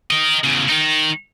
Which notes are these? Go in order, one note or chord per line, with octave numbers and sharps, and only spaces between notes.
A#4 D#5
E2 C#3
D#3 D#4